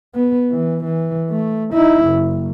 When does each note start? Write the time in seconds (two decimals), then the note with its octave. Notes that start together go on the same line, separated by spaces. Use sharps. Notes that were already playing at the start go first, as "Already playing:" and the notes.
0.15 B3
0.52 E3
0.84 E3
1.30 A3
1.73 D#4 E4
2.06 F#1